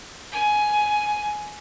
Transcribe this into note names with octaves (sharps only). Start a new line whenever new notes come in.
G#5